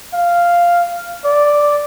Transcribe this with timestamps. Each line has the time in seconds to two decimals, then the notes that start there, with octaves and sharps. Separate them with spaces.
0.14 F5
1.25 D5